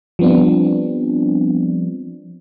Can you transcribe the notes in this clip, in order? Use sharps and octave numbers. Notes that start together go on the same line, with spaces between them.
F3 G3 B3 C4 D4